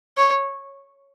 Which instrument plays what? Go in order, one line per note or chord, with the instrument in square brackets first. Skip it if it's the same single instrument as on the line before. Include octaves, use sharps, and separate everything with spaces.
[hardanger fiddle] C#5